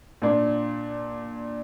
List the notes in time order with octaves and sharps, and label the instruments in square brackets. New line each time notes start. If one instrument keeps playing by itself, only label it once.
[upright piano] A#2 D4